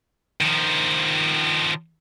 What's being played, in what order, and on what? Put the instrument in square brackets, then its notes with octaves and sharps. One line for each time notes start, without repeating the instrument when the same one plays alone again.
[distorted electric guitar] D#3 F3